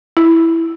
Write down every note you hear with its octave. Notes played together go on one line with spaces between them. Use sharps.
E4